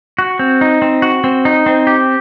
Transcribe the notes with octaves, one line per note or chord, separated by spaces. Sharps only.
F#4
C4
D#4
C4
F#4
C4
D#4
C4
G4